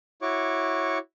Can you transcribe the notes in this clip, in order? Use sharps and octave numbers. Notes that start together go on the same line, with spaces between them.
E4 F#4 C#5 C#6 D6